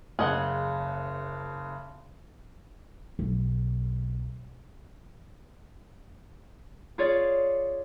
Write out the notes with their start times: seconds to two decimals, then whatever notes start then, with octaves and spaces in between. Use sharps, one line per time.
0.19 F#1 C#3 G#4 D#5 F#5
3.19 B1
6.98 F4 G#4 C#5 D5